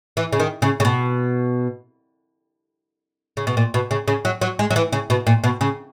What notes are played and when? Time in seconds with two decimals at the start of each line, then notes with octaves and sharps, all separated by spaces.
0.17 E3
0.33 C#3
0.40 D#3
0.62 C#3
0.80 C#3
0.85 B2
3.37 C#3
3.47 B2
3.57 A#2
3.74 B2
3.91 C#3
4.08 C#3
4.25 F#3
4.41 F#3
4.59 G#3
4.71 F#3
4.76 E3
4.92 C#3
5.10 B2
5.27 A#2
5.44 B2
5.61 C#3